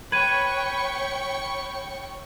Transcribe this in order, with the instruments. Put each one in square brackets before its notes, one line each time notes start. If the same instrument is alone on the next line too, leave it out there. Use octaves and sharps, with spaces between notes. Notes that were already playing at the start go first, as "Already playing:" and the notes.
[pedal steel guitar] B4 [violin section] C#5 G5 C#6 [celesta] G#6 D#7